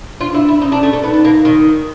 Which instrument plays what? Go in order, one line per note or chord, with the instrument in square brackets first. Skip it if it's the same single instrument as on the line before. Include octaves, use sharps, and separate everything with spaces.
[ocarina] D4 [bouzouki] F4
[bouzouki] E4
E4
[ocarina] C#4 [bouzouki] D#4
[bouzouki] D4
[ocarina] C#4
[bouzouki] A3
A3
[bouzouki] B3 [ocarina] D#4
[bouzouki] B3
A#3
D#3